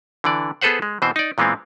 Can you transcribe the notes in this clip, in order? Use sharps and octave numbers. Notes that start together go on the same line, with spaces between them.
D3 E3 D5
B3 G#4 A4 B4 C5 F#5
G#3
B2 E3 C4 C5
D#4 D5
A#2 E3 G#3 B3 C4